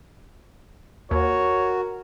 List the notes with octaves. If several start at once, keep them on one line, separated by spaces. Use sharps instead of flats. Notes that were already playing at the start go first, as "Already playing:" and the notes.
D#2 F#4 A#4 C#5